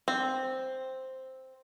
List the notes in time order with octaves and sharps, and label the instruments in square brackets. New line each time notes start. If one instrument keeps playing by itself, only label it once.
[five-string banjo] C4